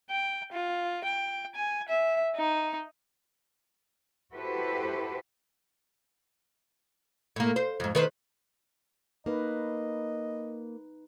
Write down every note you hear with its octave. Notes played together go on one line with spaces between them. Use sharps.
G5
F4
G5
G#5
E5
D#4
E4 F#4 G4 A4 B4 C5
A2 A#3
C5
F2 G#2
D#3 B4 C5
A#3 D#4 B4 D#5